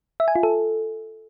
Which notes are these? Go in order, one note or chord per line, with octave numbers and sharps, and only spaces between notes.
E5
G#5
F4
A4